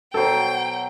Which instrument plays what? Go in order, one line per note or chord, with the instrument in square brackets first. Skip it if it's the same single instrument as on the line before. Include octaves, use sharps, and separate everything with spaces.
[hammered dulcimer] B2 F#3 [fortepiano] A4 C5 [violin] G5